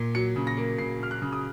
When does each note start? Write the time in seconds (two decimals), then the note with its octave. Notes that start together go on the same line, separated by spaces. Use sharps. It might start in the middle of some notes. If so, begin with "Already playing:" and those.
Already playing: A#2
0.15 F#3 C#7
0.36 C#3
0.47 A#6
0.57 A#3
0.78 C#3 C7
1.00 F#3 F6
1.11 F#6
1.22 C#3
1.32 D#6